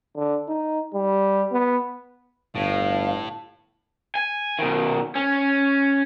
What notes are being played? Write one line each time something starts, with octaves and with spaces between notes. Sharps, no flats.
D3
D#4
G3
B3
G1 A2 F5
G#5
B2 D#3
C#4